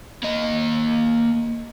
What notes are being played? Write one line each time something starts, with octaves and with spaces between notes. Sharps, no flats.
A#3 D#5